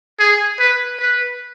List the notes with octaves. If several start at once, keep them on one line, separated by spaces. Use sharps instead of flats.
G#4
B4
B4